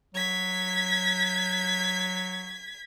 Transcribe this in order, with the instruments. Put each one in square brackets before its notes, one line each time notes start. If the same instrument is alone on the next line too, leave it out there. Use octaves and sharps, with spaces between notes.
[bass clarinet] F#3 [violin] G#6 B6